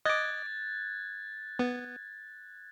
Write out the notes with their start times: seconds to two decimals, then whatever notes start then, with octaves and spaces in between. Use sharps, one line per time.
0.05 D#5 D6 F#6 G#6 A6
1.59 B3